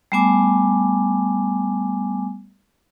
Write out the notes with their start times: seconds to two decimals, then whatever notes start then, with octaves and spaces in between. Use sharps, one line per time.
0.12 G3 A3 B3 G#5 D6